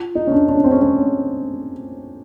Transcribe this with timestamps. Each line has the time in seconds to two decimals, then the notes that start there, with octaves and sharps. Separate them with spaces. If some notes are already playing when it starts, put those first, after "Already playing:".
Already playing: F4
0.15 D#4
0.27 C#4
0.32 D4
0.49 D4
0.57 C#4
0.64 C4
0.71 C#4
0.82 C#4